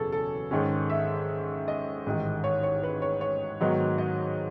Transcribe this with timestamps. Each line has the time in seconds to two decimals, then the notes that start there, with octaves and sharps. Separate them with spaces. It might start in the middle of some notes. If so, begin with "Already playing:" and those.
Already playing: F#1 E2 B2 C#4 G#4 A4
0.12 A4
0.51 G#2 D#3 G#3 C#4
0.90 E5
1.68 D#5
2.06 A1 G#2 D#3
2.44 C#5
2.63 C#5
2.83 B4
3.02 C#5
3.21 C#5
3.61 G#2 D#3 F#3 B3 D#4
3.98 D#5